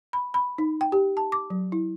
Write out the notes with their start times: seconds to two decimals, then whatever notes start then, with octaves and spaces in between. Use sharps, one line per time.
0.13 B5
0.34 B5
0.58 D#4
0.81 G5
0.92 G4
1.17 A5
1.32 D6
1.50 F#3
1.72 E4